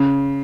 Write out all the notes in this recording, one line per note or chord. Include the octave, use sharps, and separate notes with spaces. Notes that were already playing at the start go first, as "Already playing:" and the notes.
Already playing: C#3